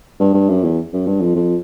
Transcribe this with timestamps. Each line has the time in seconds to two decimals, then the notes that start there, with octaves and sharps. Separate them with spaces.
0.20 G2
0.34 G2
0.49 F#2
0.64 E2
0.93 F#2
1.06 G2
1.21 F2
1.35 F2